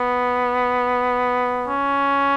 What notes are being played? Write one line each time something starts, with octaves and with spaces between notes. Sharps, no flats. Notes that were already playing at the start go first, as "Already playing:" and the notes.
Already playing: B3
C#4